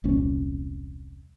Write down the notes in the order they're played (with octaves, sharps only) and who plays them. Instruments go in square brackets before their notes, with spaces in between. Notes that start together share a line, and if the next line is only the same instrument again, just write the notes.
[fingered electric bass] E1 C2 A#2 C#4